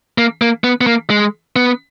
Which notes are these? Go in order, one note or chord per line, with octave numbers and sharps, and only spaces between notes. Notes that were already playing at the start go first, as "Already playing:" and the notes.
A#3
A#3
B3
B3
A#3
G#3
B3